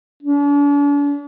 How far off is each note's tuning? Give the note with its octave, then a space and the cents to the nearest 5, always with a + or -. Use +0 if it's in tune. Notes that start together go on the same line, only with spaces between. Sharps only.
D4 -45